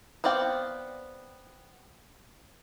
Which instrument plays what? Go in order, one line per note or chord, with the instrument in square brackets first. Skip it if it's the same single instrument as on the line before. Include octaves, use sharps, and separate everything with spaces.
[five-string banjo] B3 C4 D5 F5 G5